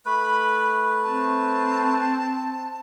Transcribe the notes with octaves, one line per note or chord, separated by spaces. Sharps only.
A3 B4 B5
C4 A5